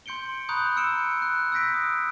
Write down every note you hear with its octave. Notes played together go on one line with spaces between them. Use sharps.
C6 G6 C#7 D7 G7
A#5 B5 C#6 D#6 F#6 G6
E6 F6 C#7 D7 E7
F#6
E6 F#6 G6 A#6 B6 D7
D#6